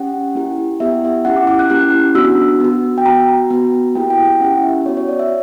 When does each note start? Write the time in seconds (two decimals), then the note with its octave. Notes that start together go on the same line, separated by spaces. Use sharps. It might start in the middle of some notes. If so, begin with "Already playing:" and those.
Already playing: C#4 G4 F#5
0.35 A#3 E4 G4
0.80 B3 E4 G4 E5
0.93 F#5
1.05 E5
1.25 C#4 E4 G4 F#5
1.36 D6
1.47 D6
1.59 F#6
1.70 A#3 C#4 E4 G4 F#6
2.15 B3 D4 F#4 E6
2.60 B3 F#4
2.98 G5
3.05 B3 F#4 A#5
3.50 B3 F#4
3.95 A#3 E4 G4 G5
4.10 G5
4.25 G5
4.40 C#4 E4 G4 F#5
4.63 E5
4.86 B3 F#4 C#5
4.97 C#5
5.09 D5
5.19 E5